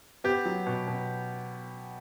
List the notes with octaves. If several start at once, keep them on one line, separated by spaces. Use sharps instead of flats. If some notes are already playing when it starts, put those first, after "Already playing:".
B3 G4
F#3
B2
B2